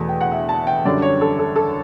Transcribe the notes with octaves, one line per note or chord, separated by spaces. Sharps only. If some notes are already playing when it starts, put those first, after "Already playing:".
Already playing: E2 B2 A3
G5
F#5
E5
A5
G5
F#2 D3 G3 D5
C#5
A4
A4
A4